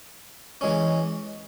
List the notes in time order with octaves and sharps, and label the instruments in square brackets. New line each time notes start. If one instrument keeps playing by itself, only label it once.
[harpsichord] E3 G#3 C#4